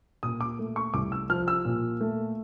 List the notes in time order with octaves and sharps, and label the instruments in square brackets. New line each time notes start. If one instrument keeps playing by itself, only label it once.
[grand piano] A#2 D#6
D6
A3
C#6
C2 D6
E6
F3 F6
E6
A#2
A3